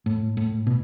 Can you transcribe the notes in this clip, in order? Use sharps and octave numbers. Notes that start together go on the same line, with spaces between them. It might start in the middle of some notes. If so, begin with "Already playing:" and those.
A2
A2
B2